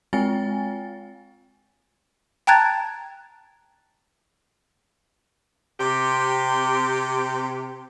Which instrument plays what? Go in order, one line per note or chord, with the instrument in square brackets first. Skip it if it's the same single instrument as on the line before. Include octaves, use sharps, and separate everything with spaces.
[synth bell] G#3 C4 F4 G5 G#5 A6
[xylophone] G5 A5 A#5 F#6 G#6 A6
[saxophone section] C3 G4